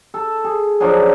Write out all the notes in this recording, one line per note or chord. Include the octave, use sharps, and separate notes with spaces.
A4
G#4
F3 F#3 D4 G#4